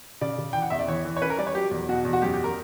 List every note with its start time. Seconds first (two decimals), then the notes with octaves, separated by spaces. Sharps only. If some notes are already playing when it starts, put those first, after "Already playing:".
0.21 C#3 D5
0.38 C#3
0.53 E3 G5
0.62 F#5
0.70 E2 E5
0.79 D5
0.88 E3 C#5
1.05 E3
1.17 C#5
1.22 C#4 B4
1.30 A#4
1.38 G3 D5
1.47 C#5
1.55 F#3 G4
1.71 E2
1.89 B2 F#4
2.05 E2
2.13 F#4
2.22 F#2 G4
2.33 G4
2.44 A#4